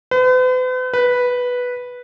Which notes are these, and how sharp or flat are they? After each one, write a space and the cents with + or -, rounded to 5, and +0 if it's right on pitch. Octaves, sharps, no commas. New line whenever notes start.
B4 +45
B4 -5